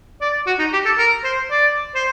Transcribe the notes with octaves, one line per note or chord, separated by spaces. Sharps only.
D5
F#4
D#4
G4
A4
A#4
C5
D5
C5